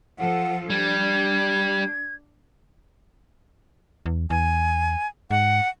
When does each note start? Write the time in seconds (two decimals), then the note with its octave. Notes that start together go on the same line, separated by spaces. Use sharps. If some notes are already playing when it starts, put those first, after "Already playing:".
0.19 F3 F4 A4 F#5
0.70 G3 D4 G#6
4.06 E2
4.30 E2 G#5
5.31 G#2 F#5